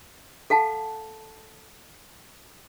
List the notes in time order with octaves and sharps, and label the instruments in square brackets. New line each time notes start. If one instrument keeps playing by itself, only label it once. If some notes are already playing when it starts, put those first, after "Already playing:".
[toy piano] A4 F5 F#5 A5